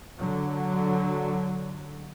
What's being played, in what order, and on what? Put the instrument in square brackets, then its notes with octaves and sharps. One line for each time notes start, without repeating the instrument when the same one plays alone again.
[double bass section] D3 F#3